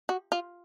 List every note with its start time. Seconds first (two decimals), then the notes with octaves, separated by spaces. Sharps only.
0.09 F#4
0.32 F4